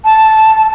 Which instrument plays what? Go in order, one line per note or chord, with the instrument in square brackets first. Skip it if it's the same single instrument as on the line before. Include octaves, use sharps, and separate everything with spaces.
[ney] A5